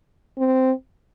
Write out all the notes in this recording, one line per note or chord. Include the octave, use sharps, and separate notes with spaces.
C4